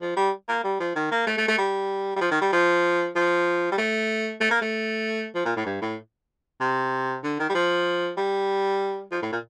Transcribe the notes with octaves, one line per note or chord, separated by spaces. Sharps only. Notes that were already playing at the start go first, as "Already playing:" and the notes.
F3
G3
A#3
G3
F3
D#3
A#3
A3
A3
A3
G3
G3
F3
D#3
G3
F3
F3
G3
A3
A3
A#3
A3
F3
A#2
A2
G2
A2
C3
D3
D#3
G3
F3
G3
F3
A2
A#2